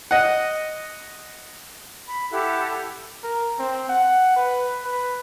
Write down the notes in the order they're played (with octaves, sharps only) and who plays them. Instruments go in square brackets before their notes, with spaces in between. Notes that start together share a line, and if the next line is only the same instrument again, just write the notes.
[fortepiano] D#5 F#5
[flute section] B5
E4 G4 A4 F#5
[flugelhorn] A#4
C4
F#5
B4
B4